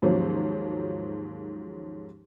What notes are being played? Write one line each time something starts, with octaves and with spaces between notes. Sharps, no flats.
D#2 G#2 F3 F#3 A#3 C#4